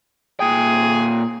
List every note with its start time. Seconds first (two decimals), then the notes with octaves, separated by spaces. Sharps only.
0.40 A#2 G#4 G5